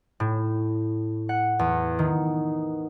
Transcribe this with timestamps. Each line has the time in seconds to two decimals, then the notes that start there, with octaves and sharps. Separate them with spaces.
0.20 A2
1.29 F#5
1.59 E2
1.99 D#3